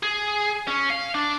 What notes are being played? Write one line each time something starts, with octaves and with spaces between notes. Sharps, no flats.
G#4
C#4
F5
D4